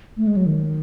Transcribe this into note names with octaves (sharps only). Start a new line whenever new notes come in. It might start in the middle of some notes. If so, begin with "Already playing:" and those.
A3
G#3
F#3
D#3